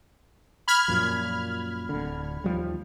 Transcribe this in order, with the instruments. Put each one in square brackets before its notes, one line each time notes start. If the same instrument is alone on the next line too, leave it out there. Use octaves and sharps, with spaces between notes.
[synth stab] B5 F6 G#6
[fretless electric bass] F#2 A#2 F3
D1 D3
D#2 F3 G3